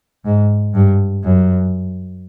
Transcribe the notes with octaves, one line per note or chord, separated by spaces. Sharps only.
G#2
G2
F#2